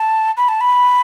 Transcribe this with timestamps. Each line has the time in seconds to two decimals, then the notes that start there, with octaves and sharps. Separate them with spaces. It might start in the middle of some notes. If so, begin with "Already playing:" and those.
Already playing: A5
0.37 B5
0.49 A5
0.61 B5